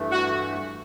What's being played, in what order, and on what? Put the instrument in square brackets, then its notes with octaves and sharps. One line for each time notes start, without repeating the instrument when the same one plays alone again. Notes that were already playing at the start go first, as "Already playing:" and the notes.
Already playing: [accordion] G2 E3 A3
[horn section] F#4